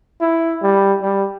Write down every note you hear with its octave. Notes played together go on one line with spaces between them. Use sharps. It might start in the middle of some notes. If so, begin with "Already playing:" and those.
E4
G3
G3